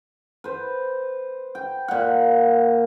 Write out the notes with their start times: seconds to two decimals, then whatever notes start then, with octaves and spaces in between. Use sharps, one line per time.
0.44 B4 C5
1.55 G5
1.88 A#2 F#5